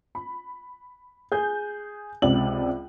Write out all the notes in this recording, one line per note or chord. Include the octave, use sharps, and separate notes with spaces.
B5
G#4 G6
C#2 C3 D5 F#7